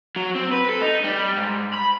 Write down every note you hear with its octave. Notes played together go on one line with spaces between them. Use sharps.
F#3
C4
B4
A4
D#4
G3
G#2
B5